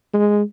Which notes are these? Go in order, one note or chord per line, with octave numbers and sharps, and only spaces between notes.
G#3